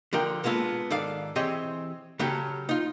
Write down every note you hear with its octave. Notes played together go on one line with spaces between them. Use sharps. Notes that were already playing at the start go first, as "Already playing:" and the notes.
D3 F3 A#4 G5
G#3 A#3 B3 F4 A4
G#2 D#3 A4 D5 F5
E3 C4 G4 G#4 C#5 D#5
C#3 F#3 C#4 G4 A4
D#4 F4